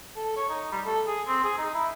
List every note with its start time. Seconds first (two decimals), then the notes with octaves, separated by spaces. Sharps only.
0.16 A4
0.37 C#5
0.49 D#4
0.72 G3
0.86 A4
1.07 G#4
1.28 C4
1.44 G#4
1.58 D#4
1.74 E4